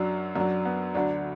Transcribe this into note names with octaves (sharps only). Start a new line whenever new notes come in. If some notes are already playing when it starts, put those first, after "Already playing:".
Already playing: F#2 F#3 D4
F#2 F#3 D4
B3
D2 D3 F#3 D4